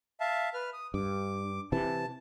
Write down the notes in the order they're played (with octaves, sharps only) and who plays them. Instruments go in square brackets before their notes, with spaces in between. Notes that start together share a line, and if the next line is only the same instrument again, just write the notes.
[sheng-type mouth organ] E5 F5 A5
B4 F6
D#6
[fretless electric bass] G2 [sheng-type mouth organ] D6
[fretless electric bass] C3 E3 [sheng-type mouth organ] A5